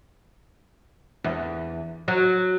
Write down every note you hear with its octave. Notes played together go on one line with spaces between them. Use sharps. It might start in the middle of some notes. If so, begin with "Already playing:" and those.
E2
F#3